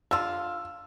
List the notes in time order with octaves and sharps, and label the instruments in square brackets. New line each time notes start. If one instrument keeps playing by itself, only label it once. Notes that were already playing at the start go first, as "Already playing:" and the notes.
[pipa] D3 F4 [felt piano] E6